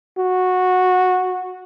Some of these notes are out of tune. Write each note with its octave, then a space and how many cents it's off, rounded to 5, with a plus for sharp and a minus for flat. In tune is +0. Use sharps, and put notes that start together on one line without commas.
F#4 -10